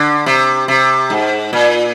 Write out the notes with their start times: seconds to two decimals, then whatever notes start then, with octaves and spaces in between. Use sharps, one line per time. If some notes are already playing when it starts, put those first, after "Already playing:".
Already playing: D3
0.26 C3
0.68 C3
1.10 G#2
1.53 A#2